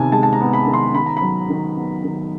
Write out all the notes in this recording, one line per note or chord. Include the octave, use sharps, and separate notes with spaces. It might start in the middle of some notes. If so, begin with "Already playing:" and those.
Already playing: C3 D#3 B3 G#5 A5
G#3 A5
A5
A#5
B3
B5
D#3
C6
D#3 B5
A#5
B5
F#3
D#3
B3
D#3